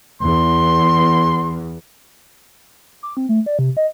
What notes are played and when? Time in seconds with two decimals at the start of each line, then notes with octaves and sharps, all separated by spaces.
0.21 E2 C6
3.03 D6
3.17 C4
3.29 A3
3.46 D5
3.59 C3
3.77 D#5